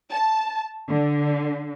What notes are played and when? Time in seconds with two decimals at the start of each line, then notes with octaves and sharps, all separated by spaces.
0.12 A5
0.89 D3